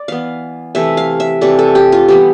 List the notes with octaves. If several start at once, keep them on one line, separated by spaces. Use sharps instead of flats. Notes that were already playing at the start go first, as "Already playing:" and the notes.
Already playing: D5
E3 B3 F5
C3 E3 A3 E5
F5
E5
C3 E3 A3 D5
A4
G4
F4
E3 G3 B3 G4